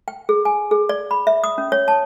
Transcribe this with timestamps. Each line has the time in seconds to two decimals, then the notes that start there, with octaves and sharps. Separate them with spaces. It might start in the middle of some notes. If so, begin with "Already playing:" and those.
0.08 G5
0.29 G#4
0.45 G#5
0.71 G#4
0.89 D5
1.11 B5
1.27 E5
1.44 D#6
1.58 C#4
1.72 C#5
1.88 A5